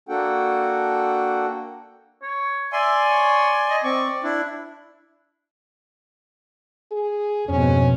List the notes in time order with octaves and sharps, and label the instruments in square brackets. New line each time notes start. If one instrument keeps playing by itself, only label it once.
[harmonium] A#3 D4 F#4 A4 F#5 G5
[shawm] C#5
[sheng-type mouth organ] D5 G#5 C6 [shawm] E5
[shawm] C#5
D#5
[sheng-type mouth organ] C4 C#6 [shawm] D5
[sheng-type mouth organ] D4 E4
[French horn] G#4
[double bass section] F2 G#2 B2 [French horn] C#4